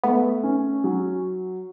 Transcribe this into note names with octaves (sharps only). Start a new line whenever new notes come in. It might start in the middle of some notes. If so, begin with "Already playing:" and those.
A3 B3
C#4
F#3